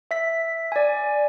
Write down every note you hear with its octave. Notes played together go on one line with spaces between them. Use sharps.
E5 B6
D5 G#5